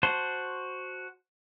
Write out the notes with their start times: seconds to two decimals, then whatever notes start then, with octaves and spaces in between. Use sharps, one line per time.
0.03 F#4 C5 A5 C6